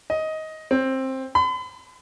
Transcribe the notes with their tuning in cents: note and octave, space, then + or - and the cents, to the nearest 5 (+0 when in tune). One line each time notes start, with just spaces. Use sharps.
D#5 +15
C4 +15
B5 +45